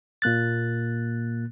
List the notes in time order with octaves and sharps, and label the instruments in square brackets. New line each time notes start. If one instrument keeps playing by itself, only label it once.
[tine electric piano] A#2 A#3 F#6 A6